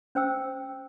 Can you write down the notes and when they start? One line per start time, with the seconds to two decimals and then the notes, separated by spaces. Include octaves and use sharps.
0.15 C#4 C5 G5 E6